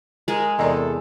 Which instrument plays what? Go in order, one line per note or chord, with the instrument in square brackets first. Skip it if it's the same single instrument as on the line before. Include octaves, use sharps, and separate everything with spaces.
[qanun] G#3 G#4 [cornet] A#4
[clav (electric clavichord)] E2 C3 A#5 [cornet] A4 [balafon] A#4 D5 D#5